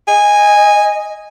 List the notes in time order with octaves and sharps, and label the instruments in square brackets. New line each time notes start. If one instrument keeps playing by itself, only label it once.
[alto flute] D#5 [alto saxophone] G#5